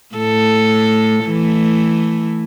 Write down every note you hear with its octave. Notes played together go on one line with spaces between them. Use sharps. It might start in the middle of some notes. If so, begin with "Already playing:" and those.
A2 A4
E3 A3